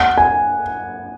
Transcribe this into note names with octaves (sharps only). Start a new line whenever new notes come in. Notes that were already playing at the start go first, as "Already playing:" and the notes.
Already playing: F#5
G#5